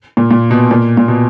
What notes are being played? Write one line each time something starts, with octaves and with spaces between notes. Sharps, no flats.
A#2
A#2
B2
A#2
A#2
B2